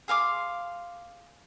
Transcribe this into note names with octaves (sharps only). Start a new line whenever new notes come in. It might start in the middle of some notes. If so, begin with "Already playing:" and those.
G#4 F5 C6 D6